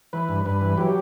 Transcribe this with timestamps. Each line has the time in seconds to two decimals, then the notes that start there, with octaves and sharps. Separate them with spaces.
0.13 E3 B4
0.29 G2
0.45 G2 B4
0.61 E3
0.77 F#3 G4